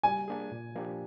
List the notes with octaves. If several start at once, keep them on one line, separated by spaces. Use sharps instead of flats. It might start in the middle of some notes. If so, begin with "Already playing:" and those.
G3 G#5
A#3 D4 G#4
A#2
F3 A#3 D4 G4